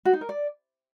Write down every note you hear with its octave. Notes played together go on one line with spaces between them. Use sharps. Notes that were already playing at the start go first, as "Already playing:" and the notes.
F#4
D#4
A#4
D5